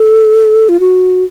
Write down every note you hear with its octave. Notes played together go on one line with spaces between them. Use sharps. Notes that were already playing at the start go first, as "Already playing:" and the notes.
Already playing: A4
F4
F#4